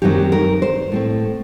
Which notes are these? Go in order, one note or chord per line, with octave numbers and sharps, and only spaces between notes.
F#2 D#3 F#3 C4 G4
A#4
C5
A2 A3 C4